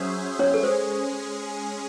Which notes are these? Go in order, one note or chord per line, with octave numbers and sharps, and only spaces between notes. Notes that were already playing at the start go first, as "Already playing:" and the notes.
Already playing: F#3 C#4 G#4 C5 E5
C#4 C#5
A4
G#3 C#4 G#4 C5